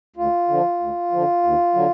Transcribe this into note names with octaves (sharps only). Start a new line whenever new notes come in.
D2 F4
D3 F3
D2
D3 F3
D#2
D3 F#3